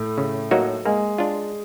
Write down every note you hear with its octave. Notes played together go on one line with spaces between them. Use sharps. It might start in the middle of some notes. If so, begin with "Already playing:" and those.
Already playing: A2 A3
C#3
F#3 A#3 D#4 F#4
G#3 A#3
D4 F4